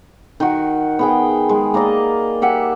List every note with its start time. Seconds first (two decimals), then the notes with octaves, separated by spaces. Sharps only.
0.40 D#3 F#4
0.99 B3 G#4 G5
1.49 G#3
1.74 A#3 A#4 D5 D#5
2.42 G4 E5 F#5 G#5